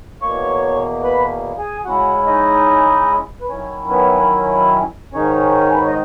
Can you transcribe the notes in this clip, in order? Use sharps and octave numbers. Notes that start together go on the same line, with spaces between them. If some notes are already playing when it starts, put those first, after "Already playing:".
E2 B2 A#3 C#5 C#6
B4 B5
G#4 G#5
C#3 G#3 C#4 E4 F#4 F#5
D#4 D#5
B4
D#3 F#3 C#4 E4 C#5
B3 B4
G#2 D#3 G#3 C#4 D#4 C#5
B4
C#5
D#5